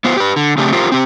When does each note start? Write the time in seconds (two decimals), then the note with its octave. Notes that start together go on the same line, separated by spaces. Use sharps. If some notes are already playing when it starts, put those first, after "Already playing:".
0.05 B3 F4 C5
0.17 G4 B4
0.36 D3
0.58 C#3 A3 C4 D4 G4
0.73 F4 G4 A#4 C5
0.92 C4 G4